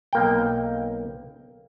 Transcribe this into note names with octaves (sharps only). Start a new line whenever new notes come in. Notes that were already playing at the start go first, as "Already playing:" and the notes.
B1 A#3 G5